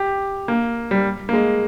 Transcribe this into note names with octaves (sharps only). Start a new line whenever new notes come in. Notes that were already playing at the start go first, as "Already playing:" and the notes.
Already playing: G4
A#3
G3
A#3
G#3